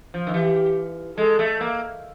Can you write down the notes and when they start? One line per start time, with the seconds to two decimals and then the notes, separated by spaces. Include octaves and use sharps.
0.14 F3
0.27 D#3
0.34 E3 G4
1.18 G#3 A4
1.39 A3
1.61 A#3